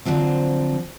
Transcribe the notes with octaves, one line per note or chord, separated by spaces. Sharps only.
D3 F3 F#3 C4